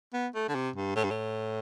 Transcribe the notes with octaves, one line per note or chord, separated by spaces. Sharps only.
B3
A3
D3
C3
G2
A2
G2
A2